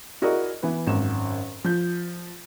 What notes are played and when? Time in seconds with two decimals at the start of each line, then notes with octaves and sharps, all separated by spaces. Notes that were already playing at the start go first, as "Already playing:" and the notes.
0.22 E4 F#4 G#4 A#4 D5 D#5
0.63 E3 B3
0.87 G#1 F#2 E7
1.64 F3 G6